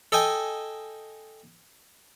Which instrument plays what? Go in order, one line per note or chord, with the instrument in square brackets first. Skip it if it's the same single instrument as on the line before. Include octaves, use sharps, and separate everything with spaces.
[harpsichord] A4 D#5 G5 G#5